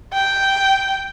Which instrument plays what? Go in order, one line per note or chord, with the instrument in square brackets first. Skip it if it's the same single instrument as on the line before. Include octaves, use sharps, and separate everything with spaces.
[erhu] G5